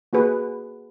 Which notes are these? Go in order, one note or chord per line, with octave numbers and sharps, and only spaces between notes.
A#3 F#4 G#4 B4